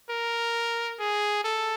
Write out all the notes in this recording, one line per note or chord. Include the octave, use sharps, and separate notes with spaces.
A#4
G#4
A4